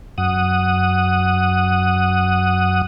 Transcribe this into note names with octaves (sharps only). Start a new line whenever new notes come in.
F#2 F#5 D#6